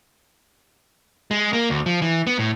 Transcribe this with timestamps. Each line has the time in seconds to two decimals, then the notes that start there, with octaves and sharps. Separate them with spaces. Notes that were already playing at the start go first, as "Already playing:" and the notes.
1.31 G#3
1.53 A#3
1.70 D2
1.86 F3
2.02 E3
2.27 B3
2.39 A2